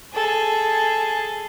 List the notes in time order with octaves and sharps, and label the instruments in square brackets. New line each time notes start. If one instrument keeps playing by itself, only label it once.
[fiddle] G#4 A4